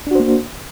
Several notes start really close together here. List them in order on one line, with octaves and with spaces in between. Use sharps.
D4 F#4 C5 A#3